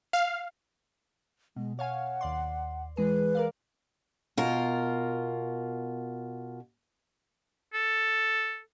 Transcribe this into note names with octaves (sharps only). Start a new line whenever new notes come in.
F5
B2 G#3
C#5 F5 F#5 G#5
D#2 D5 C6
E3 G#3 G#4 B4
A#4 D5 F5
B2 F4 A#4
A4